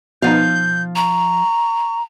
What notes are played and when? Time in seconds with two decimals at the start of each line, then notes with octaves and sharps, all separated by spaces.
0.22 B2 F3 B3 D#4 F5 G6
0.96 A#5 C#6